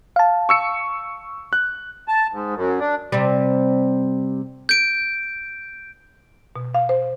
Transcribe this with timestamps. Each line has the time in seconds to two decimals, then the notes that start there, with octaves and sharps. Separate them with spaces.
0.16 F5 A5
0.49 C#6 E6 C#7
1.53 F#6
2.08 A5
2.33 G#2
2.55 F#2
2.80 D4
3.12 C3 G3
4.69 G6 D7
6.56 B2
6.74 F5
6.89 C5